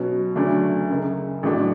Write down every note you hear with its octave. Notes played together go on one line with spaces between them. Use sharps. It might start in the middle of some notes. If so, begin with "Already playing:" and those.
Already playing: B2 F#3 C#4 F#4
D2 C#3 F#3 A3 D4
F#1 F#2 C#3
A1 A2 F#3 A3 D4